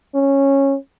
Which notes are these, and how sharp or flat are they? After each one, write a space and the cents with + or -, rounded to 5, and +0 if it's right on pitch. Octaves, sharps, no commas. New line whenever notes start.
C#4 -10